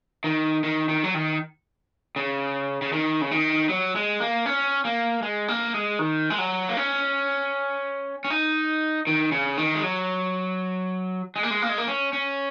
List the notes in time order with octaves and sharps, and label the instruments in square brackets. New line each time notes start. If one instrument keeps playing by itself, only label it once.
[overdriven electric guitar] D#3
D#3
D#3
F#3
D#3
C#3
C#3
D#3
C#3
D#3
F#3
G#3
A#3
C#4
A#3
G#3
A#3
G#3
D#3
G#3
F#3
A#3
C#4
C#4
D#4
D#3
C#3
D#3
G#3
F#3
G#3
A#3
G#3
A#3
G#3
A#3
C#4
C#4